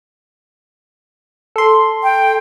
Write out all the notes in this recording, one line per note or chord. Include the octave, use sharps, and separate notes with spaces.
A4 C6
G5